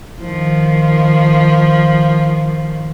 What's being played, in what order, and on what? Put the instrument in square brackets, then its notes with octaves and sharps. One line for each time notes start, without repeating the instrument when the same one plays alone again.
[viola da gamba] D#3 F3